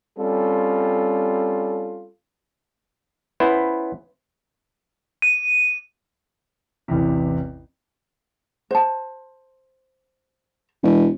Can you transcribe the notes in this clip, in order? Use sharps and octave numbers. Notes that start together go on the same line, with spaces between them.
G3 C4 C#4 F4 A4
B3 C#4 E4 C5
D#7
A1 E2 C3
C5 A5
E1